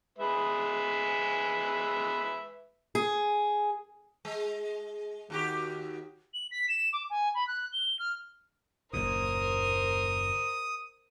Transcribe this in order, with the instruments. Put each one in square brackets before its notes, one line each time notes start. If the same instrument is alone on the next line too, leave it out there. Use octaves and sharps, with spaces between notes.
[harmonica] G#3 B4 E5
[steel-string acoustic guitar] G#4
[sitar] G#3
D#2 F#4 G4
[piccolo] F#7
B6
E7
D6
G#5
B5
F#6
G7
F6
[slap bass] F#1 D#2 A#2 [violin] A#4 C5 [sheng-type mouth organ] D#6